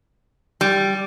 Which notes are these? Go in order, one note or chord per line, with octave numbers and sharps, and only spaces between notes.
G3